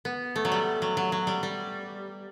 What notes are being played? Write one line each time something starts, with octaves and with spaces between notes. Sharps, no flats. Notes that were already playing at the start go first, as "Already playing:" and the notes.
B3
A3
F#3
G3
F#3
F#3
F#3
G3
G3